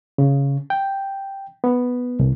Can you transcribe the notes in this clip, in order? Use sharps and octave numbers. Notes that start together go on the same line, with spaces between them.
C#3
G5
B3
C2